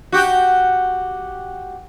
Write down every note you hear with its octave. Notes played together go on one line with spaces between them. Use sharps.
F#4 G4